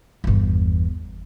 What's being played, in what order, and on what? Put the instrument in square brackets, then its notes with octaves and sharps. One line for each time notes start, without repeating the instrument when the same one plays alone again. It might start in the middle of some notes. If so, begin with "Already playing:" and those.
[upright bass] G1 E2